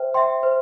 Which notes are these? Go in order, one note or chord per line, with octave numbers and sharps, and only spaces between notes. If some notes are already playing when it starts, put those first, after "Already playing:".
Already playing: C5 E5 G5
E5 G5 C6
C5